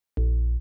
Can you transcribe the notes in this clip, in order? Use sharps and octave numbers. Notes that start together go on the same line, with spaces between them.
A#1